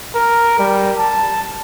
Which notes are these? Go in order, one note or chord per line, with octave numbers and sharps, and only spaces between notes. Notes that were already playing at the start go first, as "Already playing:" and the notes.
A#4
G3
A5